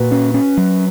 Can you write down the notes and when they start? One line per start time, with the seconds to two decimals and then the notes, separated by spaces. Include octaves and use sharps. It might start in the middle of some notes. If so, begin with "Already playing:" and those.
Already playing: A#2 F#4 B4
0.11 C#4
0.34 C#4
0.57 F#3